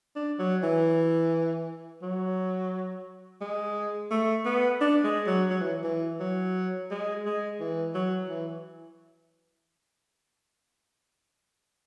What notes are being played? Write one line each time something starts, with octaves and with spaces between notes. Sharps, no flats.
D4
F#3
E3
F#3
G#3
A3
B3
D4
G#3
F#3
F#3
E3
E3
F#3
G#3
G#3
E3
F#3
E3